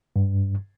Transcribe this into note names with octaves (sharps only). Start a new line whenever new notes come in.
G2